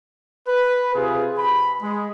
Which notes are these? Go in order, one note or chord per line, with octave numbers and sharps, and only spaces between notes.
B4
C3 F4 G#4
B5
G#3